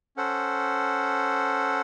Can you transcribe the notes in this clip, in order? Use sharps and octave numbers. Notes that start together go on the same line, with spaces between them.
C#4 A4 C5 F#5